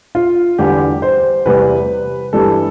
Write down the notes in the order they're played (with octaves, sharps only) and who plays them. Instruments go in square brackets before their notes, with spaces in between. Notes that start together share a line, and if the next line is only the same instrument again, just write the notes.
[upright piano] F4
E2 D3 G3 G4
C5
E2 C3 G3 B4
G2 E3 G3 A4